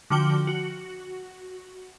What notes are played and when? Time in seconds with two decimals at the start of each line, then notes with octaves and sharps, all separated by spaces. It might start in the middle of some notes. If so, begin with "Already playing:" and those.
0.10 D3 F3 F#4 G5 D6 G7
0.47 F#4